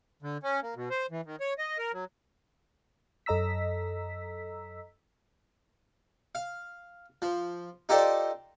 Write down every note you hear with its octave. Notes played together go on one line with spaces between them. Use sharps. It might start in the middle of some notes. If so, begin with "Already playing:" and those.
D3
C#4
A#3
B2
C5
E3
D#3
C#5
D#5
A#4
F#3
F#2 A4 D#5 A#5 E6 B6
F5
F3
D#4 F4 G4 A4 C5 D5